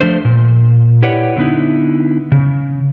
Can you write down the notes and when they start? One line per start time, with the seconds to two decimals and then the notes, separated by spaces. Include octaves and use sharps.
0.01 F3 A3 D4 C5
0.25 A#2
1.02 E4 G4 B4 C#5 D5 F#5
1.36 D3 A3 B3 D#4 E4
2.32 C#3